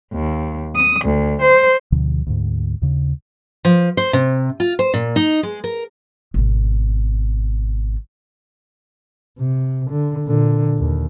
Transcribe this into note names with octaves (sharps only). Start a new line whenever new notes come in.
D#2
D#6
D2
C5
D2 B2 D3 F3
D2 G#2
D#2 C#3
F3
C5
C3
F4
C5
A#2
D#4
G#3
A#4
G#1 B2
C3
D3
A#2 D3
D#2